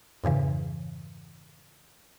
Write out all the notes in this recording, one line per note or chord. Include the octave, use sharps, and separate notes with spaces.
F2 G#2 C#3 E3